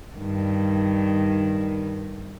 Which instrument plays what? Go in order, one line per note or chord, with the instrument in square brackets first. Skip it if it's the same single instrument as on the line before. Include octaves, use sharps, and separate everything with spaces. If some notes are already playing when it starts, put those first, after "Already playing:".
[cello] G2 D#3